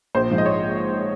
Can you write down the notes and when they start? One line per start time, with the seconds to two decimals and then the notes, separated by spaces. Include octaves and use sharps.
0.15 A#1 C5
0.30 G#2 F3
0.38 D#5
0.46 C#5